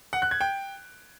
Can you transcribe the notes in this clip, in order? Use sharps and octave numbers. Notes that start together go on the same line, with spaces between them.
F#5
F#6
G#6
G5